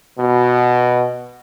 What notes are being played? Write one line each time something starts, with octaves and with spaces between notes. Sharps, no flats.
B2